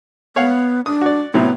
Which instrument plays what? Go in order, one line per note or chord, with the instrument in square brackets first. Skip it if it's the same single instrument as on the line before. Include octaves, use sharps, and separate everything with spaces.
[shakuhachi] B3 [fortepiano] C#5 F5 F#5
[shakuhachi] D4 [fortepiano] D#6
[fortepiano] F#4 D5
[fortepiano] A2 C3 F#3 [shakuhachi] B3